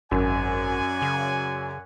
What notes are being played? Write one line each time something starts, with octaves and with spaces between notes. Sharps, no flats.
G#1 F#2 D5 F#5 G#5
C#3